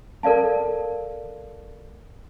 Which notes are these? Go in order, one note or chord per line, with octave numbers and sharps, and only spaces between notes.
A4 A#4 D5 F5 A5